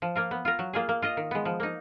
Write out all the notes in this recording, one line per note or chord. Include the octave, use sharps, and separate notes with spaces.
F3
A#3 F4 A#4
B3
F4 A#4
F#3
A#3 F4 G#4
A#3
F4 A#4 D#5
D#3
G#3 B3
F3
A#3 D#4